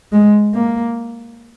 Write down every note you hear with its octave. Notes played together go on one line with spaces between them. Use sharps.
G#3
A#3